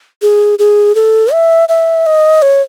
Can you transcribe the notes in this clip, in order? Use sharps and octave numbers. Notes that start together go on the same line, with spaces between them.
G#4
G#4
A4
E5
E5
D#5
C#5